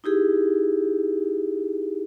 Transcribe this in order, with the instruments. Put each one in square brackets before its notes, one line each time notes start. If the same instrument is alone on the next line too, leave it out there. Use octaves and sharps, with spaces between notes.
[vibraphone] D#4 E4 G4 G#4